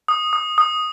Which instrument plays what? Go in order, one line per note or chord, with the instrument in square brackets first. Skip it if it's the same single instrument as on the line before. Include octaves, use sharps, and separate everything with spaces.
[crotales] D#6
D#6
D#6